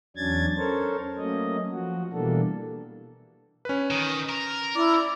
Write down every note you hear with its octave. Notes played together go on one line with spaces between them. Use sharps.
E2 F#3 C#4 D4 G#6 A6
C#4 A4 A#4 C5 C#5
F#3 A3 A#3 C#4 D#5
F3 F#4
B2 E3 G3 A#3 D4 A4
C#4 B4
D#3
A#4
E4 D5